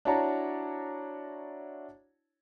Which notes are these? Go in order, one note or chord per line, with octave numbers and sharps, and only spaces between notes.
D4 E4 F#4 C#5 A5 A#5